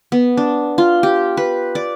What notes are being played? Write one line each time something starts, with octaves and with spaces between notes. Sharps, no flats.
B3
D4
F4
G4
B4
D5